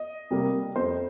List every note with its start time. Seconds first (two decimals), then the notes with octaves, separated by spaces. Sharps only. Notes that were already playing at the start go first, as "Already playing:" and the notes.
Already playing: D#5
0.31 C3 G3 A#3
0.76 F2 C5